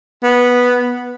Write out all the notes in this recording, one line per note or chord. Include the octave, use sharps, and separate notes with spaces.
B3